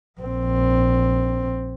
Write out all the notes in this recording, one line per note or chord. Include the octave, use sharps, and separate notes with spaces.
A#1 C4